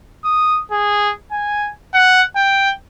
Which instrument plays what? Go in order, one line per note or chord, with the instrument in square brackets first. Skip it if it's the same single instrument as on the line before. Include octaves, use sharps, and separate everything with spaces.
[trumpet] D#6
G#4
G#5
F#5
G5